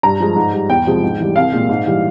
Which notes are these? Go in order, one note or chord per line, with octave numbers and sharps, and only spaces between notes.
G2 A#5
F3 G#3
G#2
G3
E2 G5
C3 F3 G#3
G#2
E3 G3
C2 F5
A#2 G#3
G#2
E3 G3